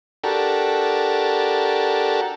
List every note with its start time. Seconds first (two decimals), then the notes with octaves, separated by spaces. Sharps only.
0.24 D4 F#4 G4 A4 A#4